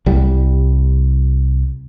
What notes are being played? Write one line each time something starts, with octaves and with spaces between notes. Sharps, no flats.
C2 G3